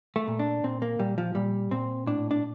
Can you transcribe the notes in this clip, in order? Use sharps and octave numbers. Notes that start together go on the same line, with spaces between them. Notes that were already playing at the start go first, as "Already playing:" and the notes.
A3
A#2
D4
A#2 C4
A#3
A#2 G3
F3
A#2 G3
A#2 C4
A2 D4
D4